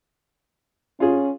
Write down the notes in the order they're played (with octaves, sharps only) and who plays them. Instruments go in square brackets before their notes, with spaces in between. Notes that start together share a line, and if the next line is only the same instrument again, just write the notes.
[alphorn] C#4 [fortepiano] F4 G#4